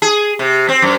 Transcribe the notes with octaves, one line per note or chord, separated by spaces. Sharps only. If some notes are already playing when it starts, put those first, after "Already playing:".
G#4
C3
C4
F#2